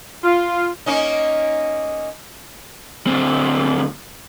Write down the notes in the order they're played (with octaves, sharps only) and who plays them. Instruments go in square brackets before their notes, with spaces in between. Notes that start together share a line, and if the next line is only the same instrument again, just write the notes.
[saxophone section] F4
[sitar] A#3 C#4 D#4
[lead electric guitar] D2 C4